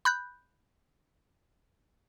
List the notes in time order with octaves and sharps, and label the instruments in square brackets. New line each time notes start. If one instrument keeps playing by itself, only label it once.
[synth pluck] B5 F#6 G6